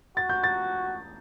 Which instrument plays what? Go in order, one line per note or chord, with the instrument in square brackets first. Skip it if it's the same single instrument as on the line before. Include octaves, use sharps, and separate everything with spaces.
[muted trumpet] F#4 [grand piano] A6
[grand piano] G6
A6